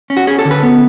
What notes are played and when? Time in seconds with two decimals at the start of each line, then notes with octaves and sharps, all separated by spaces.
0.10 C#4
0.17 F#4
0.27 C#4 G#4
0.39 A4
0.45 D3
0.51 B4
0.63 B3